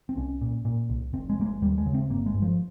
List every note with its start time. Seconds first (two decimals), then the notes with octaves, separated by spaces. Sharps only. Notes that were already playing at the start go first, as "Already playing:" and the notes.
0.09 C4
0.17 C2 C#4
0.41 A#2
0.65 A#2
0.90 C2
1.13 F1 C4
1.30 G#3
1.37 F1 A#3
1.46 G#3
1.62 D#2 G3
1.78 G#3
1.86 C#3
1.94 C4
2.10 G1 A#3
2.26 G#3
2.34 G2
2.42 F3